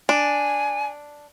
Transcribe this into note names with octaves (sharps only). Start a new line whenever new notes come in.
D4 G#5